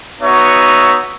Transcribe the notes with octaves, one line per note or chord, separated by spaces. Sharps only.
B3 D#4 F#4 C#5 E5